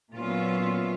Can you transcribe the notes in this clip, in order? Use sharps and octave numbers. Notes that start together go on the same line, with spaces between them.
A#2 F#3 B3 C#4 F4 E5